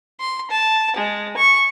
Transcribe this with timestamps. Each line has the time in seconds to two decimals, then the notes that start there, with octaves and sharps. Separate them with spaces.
0.20 C6
0.51 A5
0.96 G#3
1.37 C#6